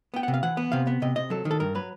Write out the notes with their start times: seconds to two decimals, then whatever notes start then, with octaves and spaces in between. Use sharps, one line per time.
0.14 B3 G5
0.23 F#5
0.28 C3
0.34 F5
0.43 E3 F#5
0.57 B3
0.72 C3 F5
0.87 B3
1.02 C3 D#5
1.16 C3 D#5
1.30 F#3 A4
1.45 D#3
1.51 A4
1.60 G2 A#4
1.75 F#3 B4